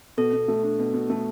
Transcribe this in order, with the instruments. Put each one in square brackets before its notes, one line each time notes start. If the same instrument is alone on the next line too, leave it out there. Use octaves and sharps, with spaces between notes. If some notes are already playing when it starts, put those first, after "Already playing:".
[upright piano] B2 [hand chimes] A4
[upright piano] B2
A3
D4
B2
B2
A3